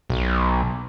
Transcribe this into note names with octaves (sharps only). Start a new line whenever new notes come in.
B1